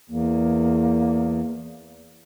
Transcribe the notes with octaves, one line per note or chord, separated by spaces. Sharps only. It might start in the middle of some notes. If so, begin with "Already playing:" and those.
E2 A#3